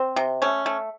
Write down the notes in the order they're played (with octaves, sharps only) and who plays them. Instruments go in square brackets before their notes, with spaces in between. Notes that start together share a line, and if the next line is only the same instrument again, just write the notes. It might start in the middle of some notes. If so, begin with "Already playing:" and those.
Already playing: [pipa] C4
C3
A3 C#4
A3